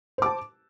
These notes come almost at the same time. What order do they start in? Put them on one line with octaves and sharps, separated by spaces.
C5 D6 A5